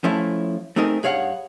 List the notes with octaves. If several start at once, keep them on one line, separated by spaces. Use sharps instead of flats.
F3 A3 C#4 E4
A3 C4 D#4 G#4 A#4
G2 G#4 C#5 F5 F#5